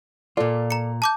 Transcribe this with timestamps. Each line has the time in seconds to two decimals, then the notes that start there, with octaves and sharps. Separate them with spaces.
0.37 A#2 F4 A4 D5
0.70 A#5 C#7
1.02 A5 D6 G6